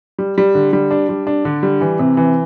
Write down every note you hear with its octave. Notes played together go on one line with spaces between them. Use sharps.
G3
G3
D3
G3
D4
G3
D4
D3
G3
E3
C3
E3